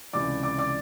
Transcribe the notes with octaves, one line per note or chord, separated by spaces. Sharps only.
C#2 C3 E3 D5 D6
D5 D6
D5 D6